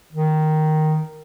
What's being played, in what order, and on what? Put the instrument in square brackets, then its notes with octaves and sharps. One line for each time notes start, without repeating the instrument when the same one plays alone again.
[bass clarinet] D#3